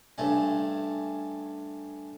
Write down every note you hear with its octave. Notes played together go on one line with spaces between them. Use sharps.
G2 A3 C#4